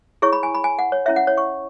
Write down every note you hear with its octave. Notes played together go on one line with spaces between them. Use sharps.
E4 G#4 C#5 C#6
B5
G#5
B5
G#5
F#5
C#5
C#4 E4 C#5 E5
F#5
C#5
C#6